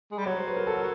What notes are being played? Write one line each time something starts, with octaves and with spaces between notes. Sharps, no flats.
G#3
G3
F#3 C#5
C5
B4
A#4
A4
A#4